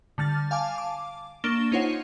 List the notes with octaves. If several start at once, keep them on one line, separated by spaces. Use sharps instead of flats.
D3 G3 F6 A6
F5 G#5 A5 D6
D6
A#3 D4 C#6 E7 G7
C#4 D#4 F4 C5 C#5 F#5